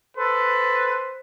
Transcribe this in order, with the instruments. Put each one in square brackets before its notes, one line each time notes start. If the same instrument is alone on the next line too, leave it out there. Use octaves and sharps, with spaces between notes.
[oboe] A4 [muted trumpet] B4 [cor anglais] C5